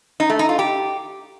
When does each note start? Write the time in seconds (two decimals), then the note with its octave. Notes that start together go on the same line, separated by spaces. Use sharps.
0.20 D#4
0.30 A3
0.39 D#4
0.49 F4
0.59 G4